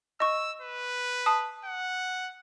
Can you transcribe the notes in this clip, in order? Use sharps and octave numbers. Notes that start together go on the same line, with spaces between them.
D#5 C#6 E6
B4
A5 D#6
F#5